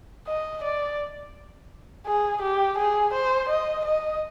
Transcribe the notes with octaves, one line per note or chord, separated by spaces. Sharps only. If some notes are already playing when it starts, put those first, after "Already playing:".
D#5
D5
G#4
G4
G#4
C5
D#5
D#5